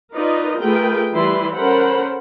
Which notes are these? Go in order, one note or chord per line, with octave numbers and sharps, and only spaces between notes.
D#4 F4 A#4 B4 D5 D#5
A3 F4 G#4 A#4 B4 G5
E3 G3 E4 B4 C6
C#4 A4 A#4 C5 F#5 B5